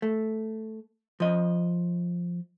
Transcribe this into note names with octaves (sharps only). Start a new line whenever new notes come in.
A3
F3 D#5